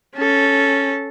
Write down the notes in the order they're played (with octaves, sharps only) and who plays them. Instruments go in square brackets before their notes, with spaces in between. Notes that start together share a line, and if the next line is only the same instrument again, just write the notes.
[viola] C#4 A4